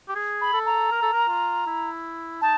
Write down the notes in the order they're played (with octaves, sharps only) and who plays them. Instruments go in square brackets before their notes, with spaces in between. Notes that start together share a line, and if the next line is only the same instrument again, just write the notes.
[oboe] G4
G#4
[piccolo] B5
[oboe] A4
[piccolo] A#5
[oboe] A#4
A4
A#4
F4
E4
[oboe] D#4 [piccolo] A5